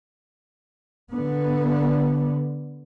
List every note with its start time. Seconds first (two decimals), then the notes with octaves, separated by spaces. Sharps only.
1.12 D3 B3